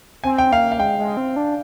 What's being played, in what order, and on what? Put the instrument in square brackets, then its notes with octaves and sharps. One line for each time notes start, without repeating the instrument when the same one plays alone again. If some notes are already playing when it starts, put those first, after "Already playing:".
[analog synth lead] C4 [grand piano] G#5
[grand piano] G5
[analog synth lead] A#3 [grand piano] F5
[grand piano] F5
[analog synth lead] G#3 [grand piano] G5
[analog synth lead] G#3
C4
D4